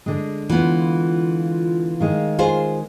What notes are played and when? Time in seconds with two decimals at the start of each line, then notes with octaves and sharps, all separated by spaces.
0.06 D3 G#3
0.50 E3 B3 F4
2.00 D#3 G#3 F5
2.39 F4 G#4 C5